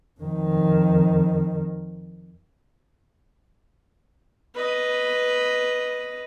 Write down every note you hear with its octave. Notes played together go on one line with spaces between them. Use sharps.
F2 D#3
B4 D#5